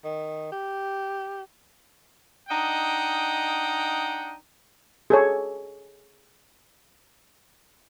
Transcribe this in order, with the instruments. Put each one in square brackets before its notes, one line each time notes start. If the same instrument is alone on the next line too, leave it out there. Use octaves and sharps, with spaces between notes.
[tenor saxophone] D#3
G4
[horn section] D4 D#4 D#5 F#5 G5
[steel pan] G#4 A4 C#5